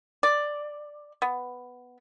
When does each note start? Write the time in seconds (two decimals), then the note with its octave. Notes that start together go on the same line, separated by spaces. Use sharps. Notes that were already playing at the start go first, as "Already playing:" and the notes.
0.23 D5
1.22 B3